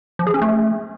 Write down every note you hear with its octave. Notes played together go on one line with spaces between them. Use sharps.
F3
G#4
C#4
A3